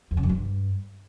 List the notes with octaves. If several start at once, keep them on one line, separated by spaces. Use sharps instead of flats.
E2
C#3
F#2
G2